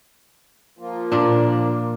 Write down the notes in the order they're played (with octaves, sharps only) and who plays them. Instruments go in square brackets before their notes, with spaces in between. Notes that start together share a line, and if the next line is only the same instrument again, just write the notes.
[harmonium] F3 A#3 F4
[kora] A#2 D4